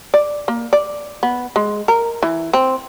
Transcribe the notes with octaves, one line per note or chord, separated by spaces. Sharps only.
D5
A#3
D5
B3
G#3
A#4
E3
C4